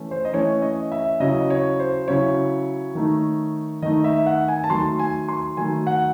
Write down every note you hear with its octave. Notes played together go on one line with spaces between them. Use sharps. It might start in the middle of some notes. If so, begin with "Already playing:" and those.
Already playing: E3 A3 C#4
C5
D#5
E3 A3 C#4 C#5
D#5
E5
C#3 F#3 C#4 E4 D#5
C#5
C5
C#3 F#3 C#4 E4 C#5
D#3 A3 D#4
D#3 A3 D#4 D#5
E5
F#5
G#5
A5
D#3 F#3 A3 C6
G#5
C6
D#3 F#3 A3 G#5
F#5